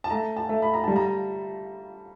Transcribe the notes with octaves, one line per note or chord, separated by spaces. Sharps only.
A5
A3 A#5
A5
A3
B5
A#5
G3 A5
A#5